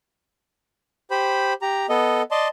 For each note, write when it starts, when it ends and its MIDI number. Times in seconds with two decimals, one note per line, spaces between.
1.11 1.53 67
1.11 1.53 72
1.11 1.53 83
1.62 1.86 67
1.62 1.86 82
1.89 2.22 59
1.89 2.22 69
1.89 2.22 75
2.31 2.48 74
2.31 2.48 75
2.31 2.48 81
2.31 2.48 84